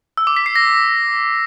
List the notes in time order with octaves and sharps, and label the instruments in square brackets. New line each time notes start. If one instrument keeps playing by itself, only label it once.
[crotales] E6
D6
B6
C7
A#6